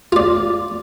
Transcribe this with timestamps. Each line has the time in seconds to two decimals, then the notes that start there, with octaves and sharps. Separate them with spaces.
0.12 F4 D5